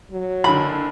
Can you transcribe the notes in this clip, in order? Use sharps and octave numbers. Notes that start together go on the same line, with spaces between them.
F#3
F#1 D3 B5